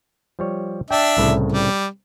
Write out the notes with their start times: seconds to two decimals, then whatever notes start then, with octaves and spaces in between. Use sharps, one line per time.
0.39 F3 G3 C#5
0.91 D4 E5 G5 A5
1.18 C2 A2 C#3
1.52 G3